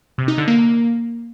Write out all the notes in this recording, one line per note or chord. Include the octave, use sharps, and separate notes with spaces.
C3
D#4
D3
A#3